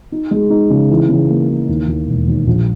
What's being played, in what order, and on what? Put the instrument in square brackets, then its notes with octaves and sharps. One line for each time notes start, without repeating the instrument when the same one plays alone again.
[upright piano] D#4
G#3
D#4
C#3
E3
C#3
A#3
E3
D#2
D#2
E1
D#2
A#1